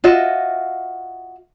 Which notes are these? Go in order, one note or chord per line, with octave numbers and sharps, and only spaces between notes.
F4 F#4 D#5 E5